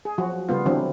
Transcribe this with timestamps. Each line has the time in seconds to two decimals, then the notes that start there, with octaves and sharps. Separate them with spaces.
0.05 G#4
0.18 F3 F#3 F#4
0.49 C#3 G3 B3 F4
0.66 D3 E3 F#3 C4 D4